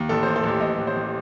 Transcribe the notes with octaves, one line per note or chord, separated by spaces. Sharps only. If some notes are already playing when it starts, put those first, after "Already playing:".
Already playing: D#2
A1 A4
A1 C5
A4
A1 G4
A1 D#5
A1
C5
A1